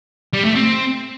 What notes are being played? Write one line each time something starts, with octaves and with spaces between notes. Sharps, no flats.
G3
A3
C4